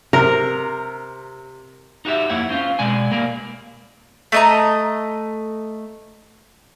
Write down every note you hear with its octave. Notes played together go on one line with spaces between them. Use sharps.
C3 A#4
D#4 F#4 G4 E5
F2 A#3 E4 C#5 F#5
C4 C#4 F4
B2 G#3 D5 G#5
G3 A#3 A#4 D5
A3 D#5 A#5